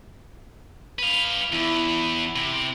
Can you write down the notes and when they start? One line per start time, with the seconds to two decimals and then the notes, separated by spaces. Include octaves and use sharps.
0.99 B4 F5
1.53 E2 E4
2.36 C3